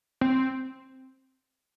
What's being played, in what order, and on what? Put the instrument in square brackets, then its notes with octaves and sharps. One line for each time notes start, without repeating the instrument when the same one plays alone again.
[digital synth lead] C4